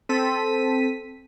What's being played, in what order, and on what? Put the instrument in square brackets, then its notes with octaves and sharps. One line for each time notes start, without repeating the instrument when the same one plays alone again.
[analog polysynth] C4 A4 B6 D#7